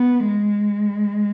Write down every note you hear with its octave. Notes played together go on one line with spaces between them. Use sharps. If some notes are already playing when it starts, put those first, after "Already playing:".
Already playing: B3
G#3